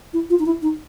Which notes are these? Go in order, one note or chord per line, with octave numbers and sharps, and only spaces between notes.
E4
F4
D#4
E4
D#4